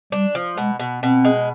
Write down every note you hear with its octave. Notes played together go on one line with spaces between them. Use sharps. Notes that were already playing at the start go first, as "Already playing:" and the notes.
G3 D4
F3
B2 G#3
B2
B2 C4
G#3